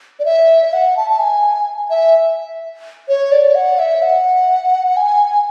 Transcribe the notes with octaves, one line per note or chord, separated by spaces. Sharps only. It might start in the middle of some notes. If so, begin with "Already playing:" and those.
D5
E5
F#5
A5
A5
G#5
E5
C#5
D5
F#5
E5
F#5
G#5